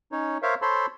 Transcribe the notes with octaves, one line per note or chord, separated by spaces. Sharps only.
C#4 D#4 C#5
A#4 C5 C#5 E5 F5
A4 C5 C#5 A5 B5 C6